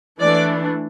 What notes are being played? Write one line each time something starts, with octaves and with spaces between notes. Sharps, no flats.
E3 A3 D4 D5